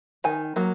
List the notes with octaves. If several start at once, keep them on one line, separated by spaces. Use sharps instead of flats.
D#3 G#5
F#3 A#3